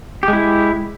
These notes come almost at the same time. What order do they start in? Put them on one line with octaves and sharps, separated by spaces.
G4 G#3 E4